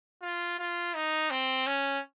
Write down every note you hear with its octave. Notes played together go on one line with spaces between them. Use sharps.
F4
F4
D#4
C4
C#4